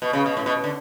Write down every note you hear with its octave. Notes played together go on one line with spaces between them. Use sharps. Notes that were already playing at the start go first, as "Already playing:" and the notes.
B2
C#3
B2
A2
B2
D3